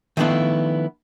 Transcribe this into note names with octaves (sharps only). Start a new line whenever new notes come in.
D#3 F3 A3 B3 D4 E4